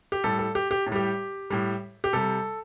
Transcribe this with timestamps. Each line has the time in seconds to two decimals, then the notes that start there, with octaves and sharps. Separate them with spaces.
0.12 G4
0.24 A2 G3 A4
0.39 A4
0.55 G4
0.71 G4
0.87 A2
0.92 G3 G4
1.50 A2 G3
2.04 G4
2.13 C3 G3 A4